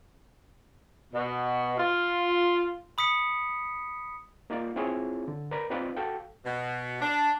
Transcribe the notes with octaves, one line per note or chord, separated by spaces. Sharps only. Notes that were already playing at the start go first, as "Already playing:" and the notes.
B2
F4
B5 D#6 B6 C#7
A#3 D#4 F4 D5 F5
C4 E4 F4 G#4 C#5
D3
A#4 B4 D5 A#5 B5
C4 D#4 F4 B4 D5 F5
F#4 A4 F5 G5
B2
D4